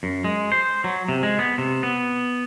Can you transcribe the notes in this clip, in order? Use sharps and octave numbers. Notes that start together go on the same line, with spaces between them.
F#2
G#3
C5
F#3
C3
G#3
B3
C3
B3